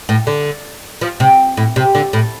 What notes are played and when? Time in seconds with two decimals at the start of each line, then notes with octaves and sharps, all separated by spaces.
0.09 A2
0.27 D3
1.01 F3
1.20 C3
1.57 A2
1.76 C3
1.95 D3
2.13 A2